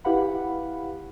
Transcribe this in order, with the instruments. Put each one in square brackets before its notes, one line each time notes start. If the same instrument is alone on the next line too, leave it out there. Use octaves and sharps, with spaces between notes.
[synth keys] E4 G4 B4 F5 F#5 B5